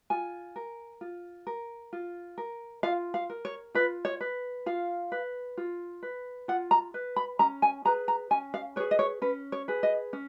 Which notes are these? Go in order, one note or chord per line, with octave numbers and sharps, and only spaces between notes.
F4 G#5
A#4
F4
A#4
F4
A#4
F4 F5
F5
A#4
C#5
F4 B4
C#5
B4
F4 F5
B4
F4
B4
F4 F#5
A#5
B4
B5
C#4 A#5
G#5
G#4 B4 A#5
A#5
C#4 G#5
F5
G#4 B4 C#5
D#5
C#5
C#4 B4
C#5
G#4 B4
D#5
C#4